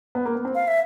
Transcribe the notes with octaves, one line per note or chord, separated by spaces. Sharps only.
B3
A#3
B3
C4
F5
E5